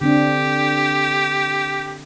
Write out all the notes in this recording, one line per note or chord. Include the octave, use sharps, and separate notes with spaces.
D3 C4 D4 G4